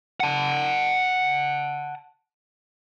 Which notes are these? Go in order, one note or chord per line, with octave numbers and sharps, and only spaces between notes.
F#5 A5